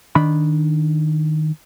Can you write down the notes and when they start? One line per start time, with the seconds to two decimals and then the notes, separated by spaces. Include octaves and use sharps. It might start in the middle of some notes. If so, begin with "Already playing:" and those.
0.15 D#3 D4 B5